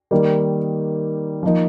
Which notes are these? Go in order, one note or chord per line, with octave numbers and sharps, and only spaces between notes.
D#3 G3 A#3 D#4
F3 A#3 D#4